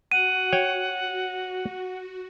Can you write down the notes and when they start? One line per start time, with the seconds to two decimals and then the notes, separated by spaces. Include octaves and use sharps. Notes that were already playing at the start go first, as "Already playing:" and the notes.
0.12 F#4 F#5 D#7
0.53 C#5 G5